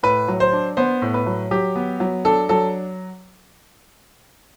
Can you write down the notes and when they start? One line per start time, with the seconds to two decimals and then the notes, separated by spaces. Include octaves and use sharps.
0.03 A2 B4
0.28 F#3
0.40 C5
0.53 D4
0.77 B3 C5
1.02 A2
1.14 B4
1.26 F#3
1.51 F#3 G4
1.75 B3
2.00 F#3
2.25 D4 A4
2.49 F#3 A4